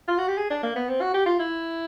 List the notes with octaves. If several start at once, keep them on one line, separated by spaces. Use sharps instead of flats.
F4
F#4
G4
G#4
D4
A#3
B3
C4
F#4
G4
F4
E4